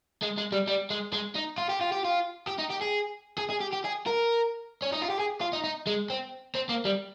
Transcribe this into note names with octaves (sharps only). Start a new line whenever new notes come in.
G#3
G#3
G3
G3
G#3
G#3
D#4
F4
G4
F4
G4
F4
G4
D#4
G4
G#4
G#4
G#4
G4
G4
G#4
A#4
C#4
D#4
F4
G4
G#4
F4
D#4
D#4
G#3
C4
C4
A#3
G3